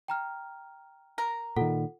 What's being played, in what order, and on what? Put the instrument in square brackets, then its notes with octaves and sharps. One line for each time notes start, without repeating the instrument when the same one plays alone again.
[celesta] G5 A#5 F6
[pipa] A#4
[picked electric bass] A#2 D#3 [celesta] F4 A4 F#5